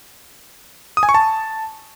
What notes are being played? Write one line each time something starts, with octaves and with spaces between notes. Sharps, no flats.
D#6
G#5
C#6
A5